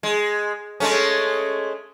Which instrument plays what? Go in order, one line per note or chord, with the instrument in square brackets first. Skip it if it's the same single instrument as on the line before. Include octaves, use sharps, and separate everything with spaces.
[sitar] G#3
G#3 A3 C#4